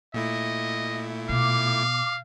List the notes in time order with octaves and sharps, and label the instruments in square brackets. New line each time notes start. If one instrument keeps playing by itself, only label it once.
[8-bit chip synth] A#2 A3 E4 [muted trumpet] D#5
[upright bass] B2 [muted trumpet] F5 [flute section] D6